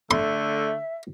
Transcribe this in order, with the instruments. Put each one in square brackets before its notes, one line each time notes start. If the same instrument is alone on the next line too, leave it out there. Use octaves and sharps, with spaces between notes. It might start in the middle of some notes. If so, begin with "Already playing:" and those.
[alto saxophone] D3 [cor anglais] A3 [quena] E5 [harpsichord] C6